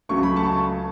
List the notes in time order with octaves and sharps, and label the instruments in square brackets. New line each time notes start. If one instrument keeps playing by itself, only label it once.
[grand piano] C#2 C#3 F#3 A3 C#6
B5
A5 C#6